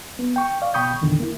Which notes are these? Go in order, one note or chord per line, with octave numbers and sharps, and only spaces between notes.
B3
G5 C#6
D5 F5
B2 G5 B5 C#6 D#6 G6
E2 A#2 D3 D#3
A#3 E4